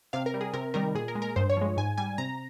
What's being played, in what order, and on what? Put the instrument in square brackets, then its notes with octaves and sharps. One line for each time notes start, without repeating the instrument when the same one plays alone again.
[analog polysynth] C3 F5
A#4
G3
G#4
C3 A#4
D#3 G3 A#4
A#2 G#4
A#4
G#3
A#4
G2 C5
C#5
F3 G#3
G#2 G#5
G3 G#5
C3 A#5